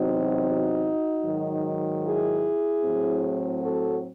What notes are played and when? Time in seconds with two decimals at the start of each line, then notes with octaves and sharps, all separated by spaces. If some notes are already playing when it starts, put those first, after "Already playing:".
Already playing: E2 C3 F#3 C4 D#4 F#4
1.24 G#2 D#3 F#3
2.03 E4 G#4
2.83 A2 F#3 C4
3.61 F#4 A4